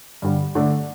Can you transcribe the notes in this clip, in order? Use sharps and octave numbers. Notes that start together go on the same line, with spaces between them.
G2 D3 G3
D3 A3 D4